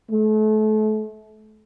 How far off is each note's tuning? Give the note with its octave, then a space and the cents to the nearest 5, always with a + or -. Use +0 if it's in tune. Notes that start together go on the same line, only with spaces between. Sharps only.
A3 -35